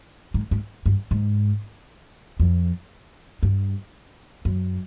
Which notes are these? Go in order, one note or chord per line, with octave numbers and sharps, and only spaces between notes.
G#2
G#2
G2
G#2
F2
G2
F#2